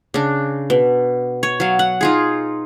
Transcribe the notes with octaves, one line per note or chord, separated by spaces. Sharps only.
C#3 D4
B2
C#5
F#3 F5
F#5
D#4 F4 G#4